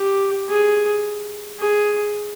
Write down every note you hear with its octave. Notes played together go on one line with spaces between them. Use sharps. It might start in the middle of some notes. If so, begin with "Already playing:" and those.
Already playing: G4
G#4
G#4